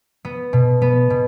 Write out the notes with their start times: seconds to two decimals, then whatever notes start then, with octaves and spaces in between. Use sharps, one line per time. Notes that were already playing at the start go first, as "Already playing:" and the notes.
0.25 B3
0.53 B2
0.82 B3
1.10 B2